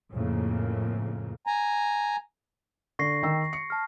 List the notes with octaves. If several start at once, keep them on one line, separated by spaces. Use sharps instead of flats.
F2 A2 C#3 A#3
G#5 A#5
D3 C#6 A#6 C7
D#3 G5 E6
C#7
A5 F6